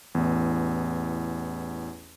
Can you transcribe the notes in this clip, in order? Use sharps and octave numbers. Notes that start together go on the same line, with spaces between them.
A1 E2